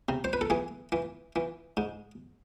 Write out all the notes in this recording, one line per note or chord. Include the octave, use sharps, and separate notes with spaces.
C3
C5
B4
A4
E3 G#4
E3
E3
G#2